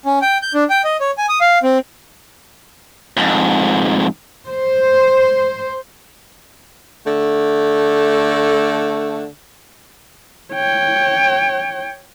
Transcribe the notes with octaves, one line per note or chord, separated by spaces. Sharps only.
C#4
G5
G6
D4
G5
D#5
C#5
G#5
D#6
F5
C4
F2 G#2
C5
D3 A3
C#5 G5